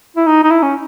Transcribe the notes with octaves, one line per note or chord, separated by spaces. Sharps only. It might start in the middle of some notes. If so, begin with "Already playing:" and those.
E4
D#4
D#4
E4
C#4